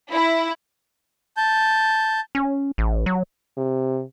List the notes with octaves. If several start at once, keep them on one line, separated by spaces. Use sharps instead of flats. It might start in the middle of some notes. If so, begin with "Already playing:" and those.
E4
A5 G6
C#4
A1
F#3
C3